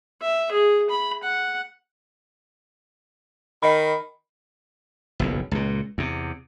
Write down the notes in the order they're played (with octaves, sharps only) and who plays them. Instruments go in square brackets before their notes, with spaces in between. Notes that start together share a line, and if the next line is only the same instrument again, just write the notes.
[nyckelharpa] E5
G#4
B5
F#5
[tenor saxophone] D#3 [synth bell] D#5 B5
[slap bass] F#1 B1 F2
C#2 A#2
E2 C3